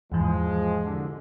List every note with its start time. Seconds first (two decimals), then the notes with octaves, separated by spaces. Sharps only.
0.12 E2 G#2 E3 F3 G#3
0.84 C2 D3